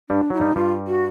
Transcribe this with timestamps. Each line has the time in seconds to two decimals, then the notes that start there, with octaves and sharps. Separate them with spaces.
0.10 G2 G3 D4
0.30 F#3 E4
0.38 G2 G3 D#4
0.56 G2 G3 F4
0.87 F#4